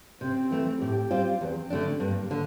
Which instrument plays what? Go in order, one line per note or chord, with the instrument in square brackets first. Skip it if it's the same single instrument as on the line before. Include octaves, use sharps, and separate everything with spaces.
[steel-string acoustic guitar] C3 [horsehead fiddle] C4
[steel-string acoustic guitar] E3 A3
[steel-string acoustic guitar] A2 [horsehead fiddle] G4
[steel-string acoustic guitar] G3 C4 F4
[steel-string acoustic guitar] E2 [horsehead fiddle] C4
[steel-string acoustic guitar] D3 A3 D4
[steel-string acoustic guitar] G2 [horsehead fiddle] A#3
[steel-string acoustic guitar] D3